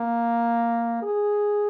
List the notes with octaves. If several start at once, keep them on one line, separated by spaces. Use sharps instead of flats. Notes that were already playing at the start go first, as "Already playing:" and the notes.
Already playing: A#3
G#4